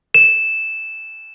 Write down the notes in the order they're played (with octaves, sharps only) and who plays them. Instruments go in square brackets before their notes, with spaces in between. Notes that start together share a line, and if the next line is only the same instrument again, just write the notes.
[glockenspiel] E7